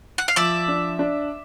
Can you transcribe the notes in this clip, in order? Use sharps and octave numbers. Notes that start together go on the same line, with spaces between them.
F#5
F5
F3 D5 E5
D4
D4